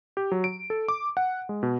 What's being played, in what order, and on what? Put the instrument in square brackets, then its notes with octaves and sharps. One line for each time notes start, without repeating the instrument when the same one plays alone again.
[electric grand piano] G4
F#3
D7
A4
D6
F#5
G#3
B2